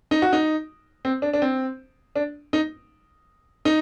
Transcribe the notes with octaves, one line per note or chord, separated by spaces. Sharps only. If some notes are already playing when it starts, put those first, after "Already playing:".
D#4
F#4
D#4
C4
D4
D4
C4
D4
D#4
D#4